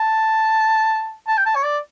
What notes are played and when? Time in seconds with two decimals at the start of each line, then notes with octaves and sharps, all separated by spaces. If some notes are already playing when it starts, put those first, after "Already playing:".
Already playing: A5
1.28 A5
1.37 G5
1.46 A5
1.55 C#5
1.63 D5